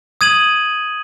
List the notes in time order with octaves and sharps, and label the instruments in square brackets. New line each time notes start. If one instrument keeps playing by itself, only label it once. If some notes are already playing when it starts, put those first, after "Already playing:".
[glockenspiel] D#6 G#6 D#7 F#7